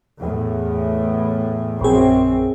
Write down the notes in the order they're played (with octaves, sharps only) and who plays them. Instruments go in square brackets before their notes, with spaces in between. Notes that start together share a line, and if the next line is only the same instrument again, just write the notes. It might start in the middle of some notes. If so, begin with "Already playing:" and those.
[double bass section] E2 A2
[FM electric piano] A#1 G#4 [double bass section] F#2 C4